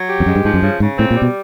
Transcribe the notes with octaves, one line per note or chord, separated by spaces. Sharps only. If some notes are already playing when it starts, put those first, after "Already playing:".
Already playing: F#3
G4
F2
F#2 G#3
G2
G#2 F3
F#2
G2 C#3
G#2 C#3
A2 C4
A#2
G3
B2